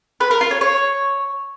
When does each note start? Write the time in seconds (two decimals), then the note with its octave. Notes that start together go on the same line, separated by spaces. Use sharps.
0.21 B4
0.31 A#4
0.41 F4
0.51 C#5
0.61 C#5